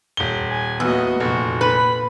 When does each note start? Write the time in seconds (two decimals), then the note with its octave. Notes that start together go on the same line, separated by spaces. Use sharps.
0.17 D#1 G7
0.48 G#5
0.80 E2 A#3 B3 F#4 D#5
1.20 F1 A#2 F#4
1.61 B4 B5